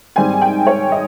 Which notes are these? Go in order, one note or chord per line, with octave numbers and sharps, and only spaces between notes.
G#2 D#3 G3 C4 G#5
G5
C#5
D#5